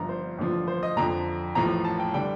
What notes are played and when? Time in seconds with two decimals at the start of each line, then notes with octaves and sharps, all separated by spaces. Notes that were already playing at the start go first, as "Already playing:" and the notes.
Already playing: G1 G2 F3 A#5
0.09 C5
0.38 A1 G2 D3 F3
0.67 C5
0.83 D#5
0.97 F2 D3 F3 A#5
1.55 A1 A2 F3 A#5
1.85 A5
1.99 G5
2.14 D3 G3 G5